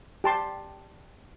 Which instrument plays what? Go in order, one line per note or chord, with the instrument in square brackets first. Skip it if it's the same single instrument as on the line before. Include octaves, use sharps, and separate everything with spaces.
[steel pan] G4 A5 C6